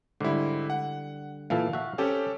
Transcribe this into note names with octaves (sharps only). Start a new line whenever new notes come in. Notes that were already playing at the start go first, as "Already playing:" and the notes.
G#2 D3 G3 E4
F#5
A#2 E3 A4 F5
F#4 E5
C4 C#4 G4 A4